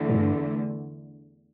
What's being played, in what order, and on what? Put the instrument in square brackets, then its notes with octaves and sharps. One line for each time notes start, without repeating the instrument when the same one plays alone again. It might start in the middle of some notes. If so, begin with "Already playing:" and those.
Already playing: [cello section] E2 D3 A3
[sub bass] A2
G2